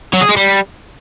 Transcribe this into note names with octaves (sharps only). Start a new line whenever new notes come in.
F#3
G#4
G#3
G3